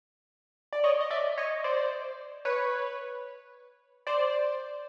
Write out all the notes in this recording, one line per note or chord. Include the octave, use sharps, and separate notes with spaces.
D5
C#5 D#5
D#5
D5 E5
C#5 D#5
C5 D5
B4 C#5
C5 D5